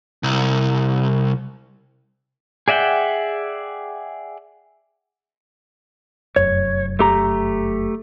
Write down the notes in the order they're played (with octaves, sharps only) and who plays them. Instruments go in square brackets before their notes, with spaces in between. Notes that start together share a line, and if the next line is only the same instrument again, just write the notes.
[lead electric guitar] C2
[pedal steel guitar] G#4 D5 E5 F#5 G5
[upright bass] F1 F#2 [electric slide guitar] C#5
[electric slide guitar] A3 G4 A#5